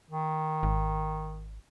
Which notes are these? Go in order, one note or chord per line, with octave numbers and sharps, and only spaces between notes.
D#3
G#1